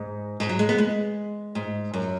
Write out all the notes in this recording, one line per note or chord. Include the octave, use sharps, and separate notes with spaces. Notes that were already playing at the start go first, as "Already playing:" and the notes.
Already playing: G#2
G#2
F#3
G#3
B3
G#3
G#2
F#2